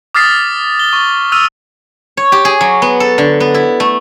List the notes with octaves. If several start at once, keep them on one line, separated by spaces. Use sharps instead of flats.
D6 D#6 F6 A6 B6 C7
G7
C#6
E6 F6 D#7 F7
C#5
G4
G#4
F#3
B3
A4
D3
B3
E4
A3